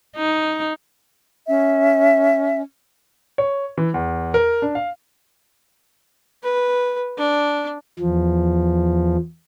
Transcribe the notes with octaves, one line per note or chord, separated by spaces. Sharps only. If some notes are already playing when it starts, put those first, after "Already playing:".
D#4
C#4 E5
C#5
E3
E2
A#4
D4
F5
B4
D4
E2 F3